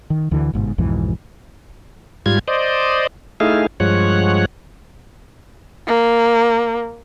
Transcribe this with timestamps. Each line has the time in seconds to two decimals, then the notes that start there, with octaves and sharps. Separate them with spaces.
0.10 D#3
0.31 D2 D3 E3
0.53 G1 G#2 B2
0.78 B1 F2 G#2 E3
2.26 G#2 G3 F4 G#6
2.48 C5 D5 D#5
3.40 A3 D#4 E4 G#4 F5
3.80 G2 F3 G#3 C#5 F#5
5.87 A#3